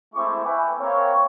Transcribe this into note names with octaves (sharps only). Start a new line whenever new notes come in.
G#3 A3 C4 E4 C#6 D6
B4 E5 G5 G#5 B5
A#3 C4 C#5